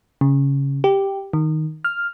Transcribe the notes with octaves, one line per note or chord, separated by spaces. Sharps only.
C#3
G4
D#3
F6